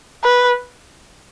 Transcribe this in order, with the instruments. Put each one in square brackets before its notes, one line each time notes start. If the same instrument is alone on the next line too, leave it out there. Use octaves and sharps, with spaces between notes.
[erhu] B4